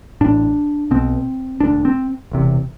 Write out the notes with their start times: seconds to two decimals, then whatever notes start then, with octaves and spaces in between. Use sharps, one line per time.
0.21 A1 A2 D4
0.91 B1 B2 C4
1.60 E1 D2 D3 D4
1.85 C4
2.31 E1 E2 C3